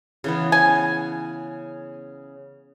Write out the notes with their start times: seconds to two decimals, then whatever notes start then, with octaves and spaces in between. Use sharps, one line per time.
0.24 C#3 E3 B3
0.52 G#5